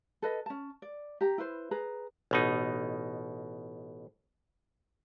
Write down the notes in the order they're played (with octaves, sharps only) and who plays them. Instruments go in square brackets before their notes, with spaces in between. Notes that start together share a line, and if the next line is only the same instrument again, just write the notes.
[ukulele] A4 B4 D#5
C#4 A5
D5
G4 A#5
E4 B4 C5
G#4 B4 A#5
[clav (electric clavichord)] A1 B2 D#4